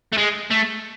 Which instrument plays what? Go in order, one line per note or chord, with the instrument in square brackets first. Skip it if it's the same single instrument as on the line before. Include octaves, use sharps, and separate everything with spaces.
[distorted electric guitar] A3
G#3
A3